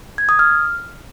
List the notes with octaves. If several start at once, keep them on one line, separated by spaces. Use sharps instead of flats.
G#6
D#6
F6